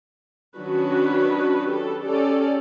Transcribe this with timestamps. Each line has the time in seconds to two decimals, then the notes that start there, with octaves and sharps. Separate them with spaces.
0.56 D#3 F#3 C#4 D4 F#4 B4
1.69 G4 A4
2.05 C#4 G4 A4 D5